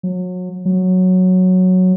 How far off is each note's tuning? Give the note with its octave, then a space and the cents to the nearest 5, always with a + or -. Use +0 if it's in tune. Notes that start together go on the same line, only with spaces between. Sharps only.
F#3 -30
F#3 -5